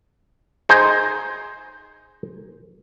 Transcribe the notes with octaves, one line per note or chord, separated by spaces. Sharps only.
D#4 G#4 C5